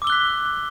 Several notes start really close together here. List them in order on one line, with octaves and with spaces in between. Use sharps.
D6 E6 G7 F#6 B6